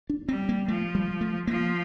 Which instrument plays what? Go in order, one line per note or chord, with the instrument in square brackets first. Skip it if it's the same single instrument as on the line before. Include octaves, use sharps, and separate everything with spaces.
[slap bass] D4
[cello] G3 [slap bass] C4
[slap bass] A#3
[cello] F3 [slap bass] A3
[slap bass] G3
A3
[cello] F3 [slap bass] A#3